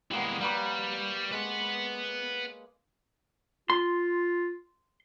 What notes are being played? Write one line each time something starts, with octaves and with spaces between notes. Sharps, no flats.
E3 G3 G#3 A#3 B3
G3 A#3 B4 C#5
G#3 B4 F#5
F4 C6